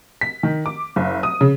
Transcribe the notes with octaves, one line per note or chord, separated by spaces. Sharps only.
B6
D#3
D6
F#1
D#6
C#3